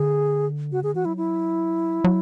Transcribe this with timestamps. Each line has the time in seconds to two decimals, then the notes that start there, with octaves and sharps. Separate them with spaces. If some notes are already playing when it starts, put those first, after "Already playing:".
Already playing: D3 G#4
0.72 C#3 F#4
0.83 D3 G#4
0.95 E3 F#4
1.05 F#3 E4
1.17 E4
2.04 F#3